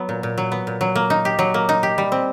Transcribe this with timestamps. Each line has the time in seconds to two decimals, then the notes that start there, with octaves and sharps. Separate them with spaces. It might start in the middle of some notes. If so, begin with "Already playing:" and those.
Already playing: F#3 B3
0.09 A#2
0.23 A#2
0.38 F#3
0.52 B3
0.67 A#2
0.81 F#3
0.95 A#3
1.10 D#4
1.25 G4
1.39 F#3
1.54 A#3
1.69 D#4
1.83 G4
1.98 G3
2.12 C4